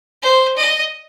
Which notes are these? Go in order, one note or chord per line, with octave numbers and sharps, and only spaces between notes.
C5
D#5